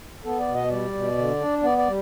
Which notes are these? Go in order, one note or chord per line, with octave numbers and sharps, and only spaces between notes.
B3 A4
D5
B2
D#5
G3 D5
B2
D3
D4
B3 D5
D5
G3